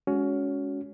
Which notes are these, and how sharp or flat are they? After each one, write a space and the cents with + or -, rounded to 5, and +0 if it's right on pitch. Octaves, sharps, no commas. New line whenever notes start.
G#3 +0 C#4 +20 F#4 +0